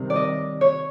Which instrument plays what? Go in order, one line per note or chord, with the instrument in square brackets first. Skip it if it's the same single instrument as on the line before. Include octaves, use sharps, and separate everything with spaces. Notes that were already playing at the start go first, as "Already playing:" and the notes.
Already playing: [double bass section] C3 D#3 G3
[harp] D5
D#5
C#5